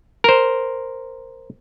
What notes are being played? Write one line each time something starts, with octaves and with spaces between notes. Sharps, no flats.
A#4 C5